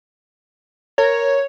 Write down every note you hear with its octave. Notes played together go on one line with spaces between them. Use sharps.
A#4 C#5